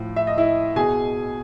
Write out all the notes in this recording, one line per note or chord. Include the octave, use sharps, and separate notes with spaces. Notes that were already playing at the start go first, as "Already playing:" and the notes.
Already playing: A2 F3
E5
D#5
E4 E5
B2 G#4 G#5